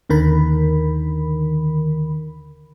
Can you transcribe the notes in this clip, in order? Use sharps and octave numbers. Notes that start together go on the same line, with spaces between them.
D#2 D3 D#3 A#4 B5